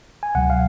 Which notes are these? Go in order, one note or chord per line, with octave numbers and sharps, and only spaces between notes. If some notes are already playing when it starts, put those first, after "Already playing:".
G#5
C#2 B2 F#3 F#5
F5